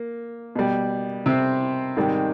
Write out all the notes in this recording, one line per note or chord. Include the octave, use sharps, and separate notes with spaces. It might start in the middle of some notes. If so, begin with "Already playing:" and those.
Already playing: A#3
B2 G3
C3 C4
G#2 D#3 G3